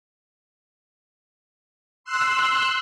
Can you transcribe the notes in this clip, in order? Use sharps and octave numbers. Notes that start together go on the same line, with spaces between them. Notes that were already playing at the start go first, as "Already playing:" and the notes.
C6 E6 F#6